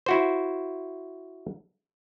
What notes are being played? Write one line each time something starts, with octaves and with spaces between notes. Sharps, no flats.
E4 F#4 C5